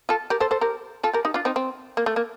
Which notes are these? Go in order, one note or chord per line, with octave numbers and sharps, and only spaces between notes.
F4 A4
G4 A#4
A4 C5
A4 C5
G4 A#4
F4 A4
G4 A#4
D#4 G4
D4 F4
C4 D#4
C4
A#3
A3
A#3